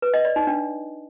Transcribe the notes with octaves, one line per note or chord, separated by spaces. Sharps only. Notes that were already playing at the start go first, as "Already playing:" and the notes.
B4
D#5
D5
D#4
D4